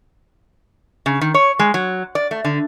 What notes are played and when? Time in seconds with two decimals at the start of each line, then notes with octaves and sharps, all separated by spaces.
1.06 C#3
1.21 D#3
1.34 C#5
1.59 G#3
1.74 F#3
2.15 D5
2.31 A3
2.45 D3